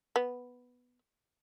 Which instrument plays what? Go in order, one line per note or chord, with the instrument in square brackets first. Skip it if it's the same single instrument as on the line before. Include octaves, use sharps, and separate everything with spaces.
[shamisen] B3